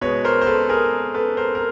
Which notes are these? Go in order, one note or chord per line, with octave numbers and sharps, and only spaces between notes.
B2 G#3 B4 C#5
A#4 C5
C5
A4 B4
G#4 A#4
A4 B4
A#4 C5
A#4